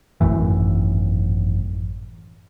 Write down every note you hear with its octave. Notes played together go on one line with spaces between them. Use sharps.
G#1 F#2 A2 E3